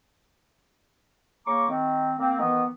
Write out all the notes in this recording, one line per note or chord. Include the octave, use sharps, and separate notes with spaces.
C#3 A#3 A#5 C#6 D6
D#3 C4
A#3 C4
D#3 E3 B3